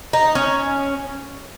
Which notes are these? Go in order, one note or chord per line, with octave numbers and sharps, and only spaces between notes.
D#4
C#4